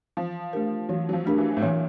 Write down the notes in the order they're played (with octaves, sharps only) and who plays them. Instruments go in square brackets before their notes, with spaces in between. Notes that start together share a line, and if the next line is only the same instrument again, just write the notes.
[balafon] E3 [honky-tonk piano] F3
[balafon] A3 D4 G4 A#4
[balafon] E3 [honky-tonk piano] F#3
[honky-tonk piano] F#3
F3
[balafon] A3 D4 G4 A#4
[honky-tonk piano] E3
A2
[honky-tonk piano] A#2 [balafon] E3